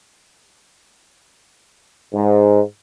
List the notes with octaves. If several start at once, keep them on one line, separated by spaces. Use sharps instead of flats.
G#2